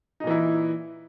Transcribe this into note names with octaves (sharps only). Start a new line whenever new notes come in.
A#2 E3 D#4 E4